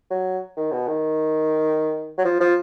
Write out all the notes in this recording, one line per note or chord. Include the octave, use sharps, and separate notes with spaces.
F#3
D#3
B2
D#3
F#3
F3
F3